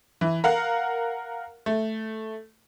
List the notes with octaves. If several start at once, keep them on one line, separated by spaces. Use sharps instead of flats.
E3
A#4 F5 F#5
A3